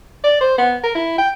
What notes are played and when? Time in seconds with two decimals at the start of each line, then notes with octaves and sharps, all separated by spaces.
0.24 D5
0.41 C5
0.58 B3
0.83 A#4
0.95 E4
1.18 G5